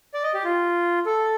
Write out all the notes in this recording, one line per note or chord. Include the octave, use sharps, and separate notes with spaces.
D5
D#5
G4
F4
A4